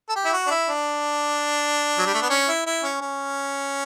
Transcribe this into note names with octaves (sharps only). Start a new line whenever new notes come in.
A4
G4
E4
F#4
D4
E4
D4
F#3
G3
A3
B3
C#4
E4
E4
C#4
C#4